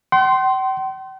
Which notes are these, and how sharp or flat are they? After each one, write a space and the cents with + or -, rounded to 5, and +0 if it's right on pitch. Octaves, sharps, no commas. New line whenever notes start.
G5 -45 C6 +0